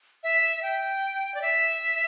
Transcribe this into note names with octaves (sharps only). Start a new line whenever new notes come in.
E5
G5
D5
E5